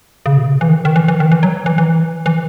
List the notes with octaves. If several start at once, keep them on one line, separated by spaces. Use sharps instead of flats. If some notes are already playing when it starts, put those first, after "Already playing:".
C#3
B2
E3
D#3
D#3
E3
E3
D#3
E3
F#3
E3
E3
E3